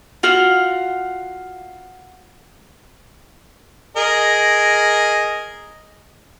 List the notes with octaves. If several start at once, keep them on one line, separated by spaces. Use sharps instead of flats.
F4 F#4 F5 F#5
G#4 A#4 D#5